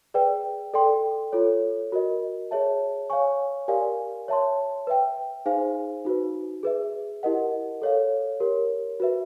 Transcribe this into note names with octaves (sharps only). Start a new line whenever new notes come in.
G#4 B4 D5 G5
A4 D5 G5 C6
F4 A4 C#5
F#4 A#4 D#5
G#4 C#5 E5 A5
C#5 F5 G#5 C#6
G4 A#4 D5 F5 G#5
C#5 E5 A5 C6
B4 E5 G5
D#4 G#4 C5 F5 G#5
D#4 F#4 B4
G#4 B4 E5
E4 G4 A#4 D#5 F#5
A4 C#5 F5
G4 A#4 C#5
F#4 B4 E5